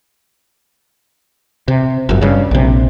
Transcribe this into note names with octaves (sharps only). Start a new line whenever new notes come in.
C3
G1 F#2
G2 C#3
A#1 C3